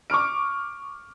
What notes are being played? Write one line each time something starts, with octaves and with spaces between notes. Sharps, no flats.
C#6 D6 F6 D7